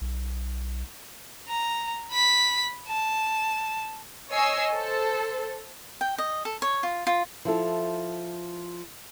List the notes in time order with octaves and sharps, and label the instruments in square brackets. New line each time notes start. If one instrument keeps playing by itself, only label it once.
[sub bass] B1
[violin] A#5
B5 B6
A5
[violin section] C#5 D#5 G#5 E6 C7
A4 C5
[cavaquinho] G5
D#5
A4
C#5
F4
F4
[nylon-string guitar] F3 E4 A4